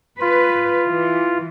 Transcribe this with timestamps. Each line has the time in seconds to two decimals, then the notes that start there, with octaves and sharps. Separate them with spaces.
0.21 F4 B4
0.85 E3